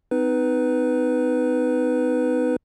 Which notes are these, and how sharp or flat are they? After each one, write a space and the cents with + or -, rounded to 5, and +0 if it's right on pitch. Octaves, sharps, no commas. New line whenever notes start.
C4 -45 D#4 +0 B4 +0